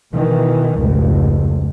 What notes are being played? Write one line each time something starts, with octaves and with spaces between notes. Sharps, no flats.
B2 D#3 E3
F1 C#2 G#2